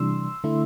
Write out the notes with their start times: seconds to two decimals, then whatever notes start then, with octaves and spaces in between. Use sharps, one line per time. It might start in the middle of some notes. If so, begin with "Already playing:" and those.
Already playing: C3 E3 G3 D4 C6 E6
0.44 D3 A3 E4